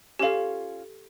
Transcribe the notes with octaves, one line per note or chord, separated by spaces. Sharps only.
C#4 F4 G4 A4 F5